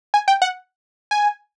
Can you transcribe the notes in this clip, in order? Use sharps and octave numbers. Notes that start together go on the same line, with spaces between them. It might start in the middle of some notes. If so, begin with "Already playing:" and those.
G#5
G5
F#5
G#5